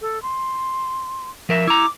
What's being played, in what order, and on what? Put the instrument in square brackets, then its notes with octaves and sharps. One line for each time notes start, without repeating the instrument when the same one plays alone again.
[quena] A4
C6
[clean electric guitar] F3 A#4 E5
[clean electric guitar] E4 A#5 [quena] D6